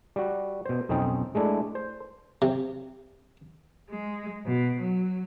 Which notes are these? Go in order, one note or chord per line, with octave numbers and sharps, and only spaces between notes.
G3 F#4
B2 C5
B1 F2 C4 C#4 D#4 G5
G#3 A3 D4 E4
C5
C3
G#3
B2
F#3